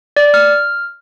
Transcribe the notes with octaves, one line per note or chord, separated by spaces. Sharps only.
D5
F6